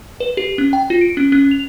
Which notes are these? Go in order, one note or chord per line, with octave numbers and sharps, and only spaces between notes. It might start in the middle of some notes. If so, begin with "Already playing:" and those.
B4
G4
C#4
G5
F4
D7
C#4
C#4
F7